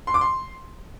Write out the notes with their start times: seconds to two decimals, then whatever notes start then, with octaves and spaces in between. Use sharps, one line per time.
0.07 C6
0.14 D6
0.21 C6